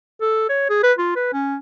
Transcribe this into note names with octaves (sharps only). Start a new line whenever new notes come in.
A4
C#5
G#4
B4
F4
B4
C#4